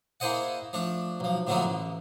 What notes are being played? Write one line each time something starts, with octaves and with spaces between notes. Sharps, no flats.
A#3 E4 G#4 C5 D#5 F#5
F3 A3 D4
B1 F3
A2 D3 F3 F#3 A#3 B3
A1